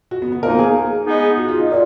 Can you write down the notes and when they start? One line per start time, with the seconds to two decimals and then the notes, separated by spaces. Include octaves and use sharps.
0.11 F#4
0.22 B3
0.32 B3
0.43 F3 A#3 D#4 A#4
0.59 G#4
1.06 G#3 B3 D#4 G#4
1.38 F#4
1.48 F4
1.59 D#4
1.69 A#2 F4